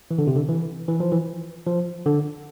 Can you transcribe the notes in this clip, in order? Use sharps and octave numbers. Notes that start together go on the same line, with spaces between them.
E3
D3
C3
D3
E3
E3
F3
E3
F3
D3